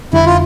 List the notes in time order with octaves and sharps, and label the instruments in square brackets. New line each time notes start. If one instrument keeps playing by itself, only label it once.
[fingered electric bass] F2 D3 G3 D4 [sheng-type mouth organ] E4
[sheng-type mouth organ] F4